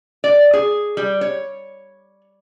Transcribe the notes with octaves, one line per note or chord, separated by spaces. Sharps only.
D5
G#4
G3
C#5